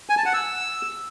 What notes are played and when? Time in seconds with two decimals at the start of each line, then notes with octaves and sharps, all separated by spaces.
0.09 G#5
0.17 A5
0.25 F#5
0.33 E6